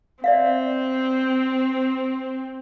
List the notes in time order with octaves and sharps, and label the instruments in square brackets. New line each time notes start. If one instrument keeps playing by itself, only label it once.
[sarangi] C4 [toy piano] D5 E5 F5